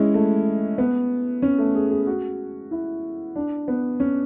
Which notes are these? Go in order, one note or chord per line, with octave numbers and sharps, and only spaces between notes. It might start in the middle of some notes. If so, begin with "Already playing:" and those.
Already playing: G#3 C#4 E4
A3
B3
C#4
A3
G#4
G#4
F#4
E4
D4
B3
C#4